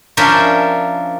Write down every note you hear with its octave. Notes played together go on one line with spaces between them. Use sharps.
F3 C#4 D4 A#4 C5 E5